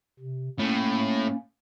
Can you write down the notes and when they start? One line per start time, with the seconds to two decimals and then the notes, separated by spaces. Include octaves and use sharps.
0.20 C3
0.59 A2 A#3 C#4